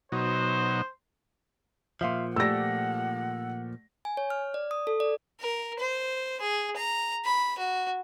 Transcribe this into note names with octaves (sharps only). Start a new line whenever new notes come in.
B2 F#3 D#4 C5
A#2 F3 E5 F5 C6
A3 G4 D5 F#5 E6 A#6
G#5
C#5
F6
D5
D#6
A4
D5
A#4
C5
G#4
A#5
B5
F#4